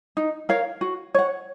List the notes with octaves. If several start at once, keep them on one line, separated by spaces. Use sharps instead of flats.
D#4
A#4 C#5 F5
F#4
C#5 F#5